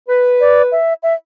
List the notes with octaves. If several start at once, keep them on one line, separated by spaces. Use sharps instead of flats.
B4
D5
E5
E5